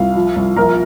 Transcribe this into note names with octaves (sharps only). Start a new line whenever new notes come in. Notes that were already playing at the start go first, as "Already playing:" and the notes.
Already playing: C2 F4 F5
F3
C2
A#1 A#4 A#5